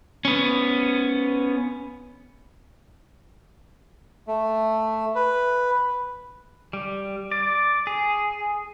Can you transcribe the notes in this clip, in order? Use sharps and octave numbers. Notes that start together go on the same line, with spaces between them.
B3 C#4
A3
B4
G3
D5
G#4